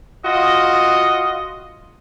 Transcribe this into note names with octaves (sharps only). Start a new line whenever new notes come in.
F4 F#4 D#5